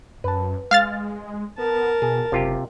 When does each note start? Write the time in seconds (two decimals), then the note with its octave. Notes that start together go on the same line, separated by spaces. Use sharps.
0.24 F#2 B4 A5
0.71 G#3 F5 F6 A6
1.58 B3 A#4 A5
2.02 B2 G#4
2.32 F#1 C3 F4 G4